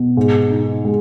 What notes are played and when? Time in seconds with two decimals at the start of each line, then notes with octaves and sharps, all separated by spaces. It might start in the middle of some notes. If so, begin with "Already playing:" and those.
Already playing: B2
0.17 G#2
0.50 D#4
0.85 G#3